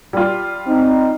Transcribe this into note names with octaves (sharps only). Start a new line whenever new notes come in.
G3 F4
C4 D#4